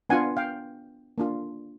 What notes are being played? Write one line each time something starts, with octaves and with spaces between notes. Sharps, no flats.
B3 D4 F4 F#5 G#5
F5 G5
A#3 D4 F4